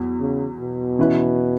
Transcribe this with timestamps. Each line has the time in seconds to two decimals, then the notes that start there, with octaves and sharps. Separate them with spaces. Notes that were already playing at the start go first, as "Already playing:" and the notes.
Already playing: E2 F#3
0.20 C#3
0.60 B2
0.99 E3 C#4 E4 B4